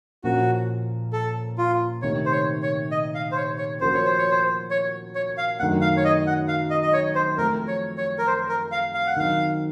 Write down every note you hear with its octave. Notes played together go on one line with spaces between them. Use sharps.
A#2 F3 A#3 C#4 F#4
A4
F4
C3 D#3 A3 C#5
C5
C#5
C#5
D#5
F5
C5
C#5
C#5
F3 A#3 C#4 F#4 A#4 C5
C#5
C5
C#5
C5
C#5
C#5
F5
F#2 D#3 A3 C4 F#5
F5
C#5
D#5
F#5
F5
D#5
D#5
C#5
C5
F3 A3 C4 A#4
C#5
C#5
A#4
C5
A#4
F5
F5
F#5
D#3 F#3 C4 F5